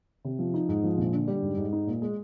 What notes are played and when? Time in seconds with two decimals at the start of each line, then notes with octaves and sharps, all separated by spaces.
0.25 C3
0.39 F3
0.54 D#4
0.69 G#2
0.84 F3
0.98 A#1
1.13 D3
1.28 G3
1.42 G#2
1.57 G#2
1.73 D#4
1.87 A#2
2.02 G#3